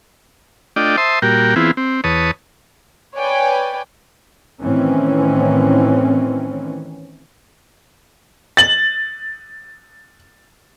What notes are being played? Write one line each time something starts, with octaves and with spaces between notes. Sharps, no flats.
A3 D4 F4 D5 D#5 G5
C5 E5 A5 C6 D#6
A#2 G3 F#4 A#4 G5
E3 B3 C4 E4 F4 G#4
C4
E2 B4 C#5 A5 D#6
B4 C#5 D5 G5 G#5
A2 D#3 E3 C4 C#4
A6 F#7